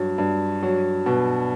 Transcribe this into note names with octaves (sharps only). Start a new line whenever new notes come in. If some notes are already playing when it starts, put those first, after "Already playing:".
Already playing: G2 F#3
G2
F#3
B2